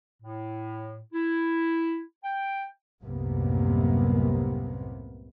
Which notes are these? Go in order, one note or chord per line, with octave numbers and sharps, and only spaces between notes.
A2
E4
G5
C2 F#2 A2 C3 A#3 B3